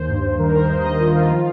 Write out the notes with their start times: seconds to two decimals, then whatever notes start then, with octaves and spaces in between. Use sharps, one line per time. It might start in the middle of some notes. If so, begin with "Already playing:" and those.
Already playing: D#2 C5
0.09 G2
0.23 G2
0.39 D#3 A#4
0.54 D#3 C5
0.69 G2 D#5
0.84 G2 D#5
1.00 D#3 F4
1.15 D#3 F4
1.31 F3 F4